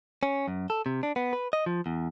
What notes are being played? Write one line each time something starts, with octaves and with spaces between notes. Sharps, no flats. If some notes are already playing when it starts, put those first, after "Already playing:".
C#4
F#2
A4
C3
D4
B3
B4
D#5
F3
E2